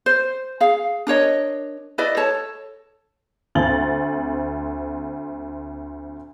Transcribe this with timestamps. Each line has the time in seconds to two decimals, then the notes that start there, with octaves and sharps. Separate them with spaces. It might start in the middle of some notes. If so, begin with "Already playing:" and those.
0.06 C5
0.61 G#4 F5
1.07 D4 A#4 C#5 D#5
1.98 E4 B4 D5 D#5
2.17 A4 C#5 A5
3.55 D2 C4 A6 F#7